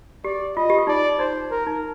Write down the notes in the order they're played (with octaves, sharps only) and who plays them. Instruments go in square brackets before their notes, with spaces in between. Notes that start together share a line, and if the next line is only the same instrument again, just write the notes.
[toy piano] G4 [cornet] D5
[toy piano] F4 [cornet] D#5
[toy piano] G4
F4
[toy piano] D#4 [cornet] D5
[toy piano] D#4 [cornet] C5
[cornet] A#4
[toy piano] D#4